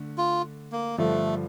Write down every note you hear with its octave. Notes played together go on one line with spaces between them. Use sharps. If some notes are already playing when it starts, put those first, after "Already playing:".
Already playing: D3 A3
F4
A#3
G2 D3 F3 A3